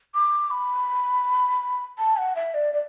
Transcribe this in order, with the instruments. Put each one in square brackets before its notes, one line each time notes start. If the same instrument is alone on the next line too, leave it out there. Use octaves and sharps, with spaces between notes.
[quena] D6
B5
A5
F#5
E5
D5
D5